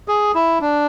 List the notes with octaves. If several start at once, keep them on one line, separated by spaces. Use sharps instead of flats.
G#4
E4
D4